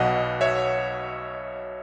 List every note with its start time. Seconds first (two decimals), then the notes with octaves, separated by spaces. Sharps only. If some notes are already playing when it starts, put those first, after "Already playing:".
Already playing: B1 B2 D#5 F#5
0.41 C#5 E5